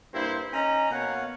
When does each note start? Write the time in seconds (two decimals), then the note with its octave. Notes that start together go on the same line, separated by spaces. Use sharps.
0.14 G2 A#3 E4 C5
0.53 C#4 D#4 A#5
0.91 B2 A#3 C#5 F5 F#5